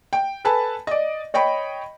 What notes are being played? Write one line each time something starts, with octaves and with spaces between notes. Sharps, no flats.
G5
A4 B4 G#5 A5 B5
D5 D#5
C#5 D#5 G5 B5